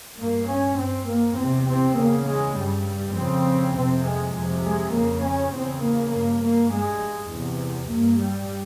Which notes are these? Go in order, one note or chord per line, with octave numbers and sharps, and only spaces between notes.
G2 A#3
C#4
G2 C4
A#3
E2 C3 C4
C4
E2 C#3 A#3
G#3
G2 G3
G3
F2 C#3 C4
F2 C3 C4
G#3
F2 C3
G#3
F2 C#3 A#3
C#4
E2 C#3 C4
A#3
G2 A#3
A#3
G2 G#3
E2 C3
G2 A#3
G3